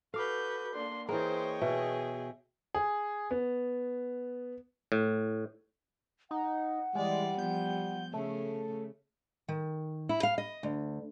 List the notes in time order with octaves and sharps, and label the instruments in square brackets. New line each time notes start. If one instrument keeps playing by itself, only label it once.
[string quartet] F#4 B4 G6 [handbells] A4 D6 [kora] F5
[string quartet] A#3 D4 [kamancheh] C6
[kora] E3 A#3 [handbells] G#4 [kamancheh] C5 [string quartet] C#5 D#5 G5
[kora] B2 [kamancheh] G#4 [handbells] E5
[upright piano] G#4
B3
[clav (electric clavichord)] A2
[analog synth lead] D#4 [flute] F#5
[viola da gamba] E3 D5 [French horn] G3 [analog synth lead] G#3
[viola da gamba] F3 B3 [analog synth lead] G6
[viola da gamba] C#3 [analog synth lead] A3
[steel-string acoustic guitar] D#3
E4
F5
D#5
D2